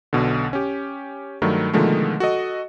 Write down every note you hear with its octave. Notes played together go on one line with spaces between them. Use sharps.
B1 B2 D3
C#4 G4
G2 D#3 F#3 A3
B2 D3 D#3 F3 G#3 A3
F#4 A4 D#5